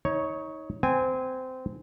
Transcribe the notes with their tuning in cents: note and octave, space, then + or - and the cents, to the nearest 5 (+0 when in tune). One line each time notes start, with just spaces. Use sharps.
D#4 +25 C#5 +0
C4 -20 G#5 -15